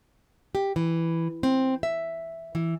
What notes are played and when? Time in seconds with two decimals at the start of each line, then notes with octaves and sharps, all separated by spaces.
0.55 G4
0.76 E3
1.43 C4
1.83 E5
2.55 E3